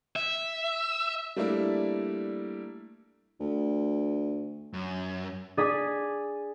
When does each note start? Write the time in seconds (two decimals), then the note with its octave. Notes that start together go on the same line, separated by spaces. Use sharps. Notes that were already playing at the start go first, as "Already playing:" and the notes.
0.16 E5
1.36 G3 A3 A#3 D4 E4
3.40 D2
4.73 F#2
5.57 D4 G#4 G#5 D#6 B6